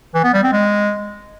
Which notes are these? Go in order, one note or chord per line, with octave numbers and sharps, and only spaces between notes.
E3
B3
G3
C4
G#3